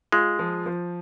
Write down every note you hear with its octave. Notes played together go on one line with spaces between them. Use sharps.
G#3 F4
F3
F3